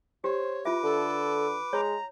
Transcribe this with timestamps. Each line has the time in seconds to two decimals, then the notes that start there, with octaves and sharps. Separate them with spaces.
0.24 G4 C5 C#5
0.65 F4 B4 E5 D6
0.83 D3 A4
1.73 G#3 C#5 A#5